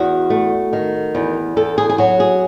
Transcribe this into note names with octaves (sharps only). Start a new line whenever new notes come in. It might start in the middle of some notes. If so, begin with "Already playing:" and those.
Already playing: E2 F#4
A3
D#3
E2
E2 A4
G#4
G#4
F#3 F#4
G#4